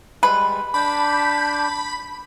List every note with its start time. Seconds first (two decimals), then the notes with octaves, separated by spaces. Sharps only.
0.23 G3 G#3 B4
0.74 D4 A5 B5 D6 G6